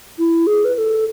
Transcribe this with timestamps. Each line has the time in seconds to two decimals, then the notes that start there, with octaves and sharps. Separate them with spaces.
0.18 E4
0.47 G#4
0.65 B4
0.75 B4
0.78 A4